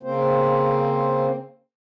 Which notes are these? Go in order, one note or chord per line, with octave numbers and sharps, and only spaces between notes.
C#3 A#3 C4 C5